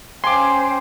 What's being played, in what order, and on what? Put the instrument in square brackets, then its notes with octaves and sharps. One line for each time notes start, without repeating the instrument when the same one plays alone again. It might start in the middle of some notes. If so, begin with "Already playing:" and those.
[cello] C#4 C5 [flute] G5 [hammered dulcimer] G#5 D6 [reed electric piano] C6